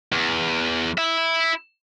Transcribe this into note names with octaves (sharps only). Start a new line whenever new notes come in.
E2
E4 E5